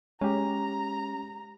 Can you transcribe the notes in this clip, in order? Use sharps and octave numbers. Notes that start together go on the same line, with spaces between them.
G#3 C#4 G4 A#5